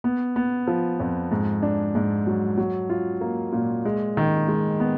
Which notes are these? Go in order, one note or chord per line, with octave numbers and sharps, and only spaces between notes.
B3
B3
F3
F2
G#2
D4
G#2
F#3
F#3
F4
A#3
A#2
G#3
D#3
G#3
B3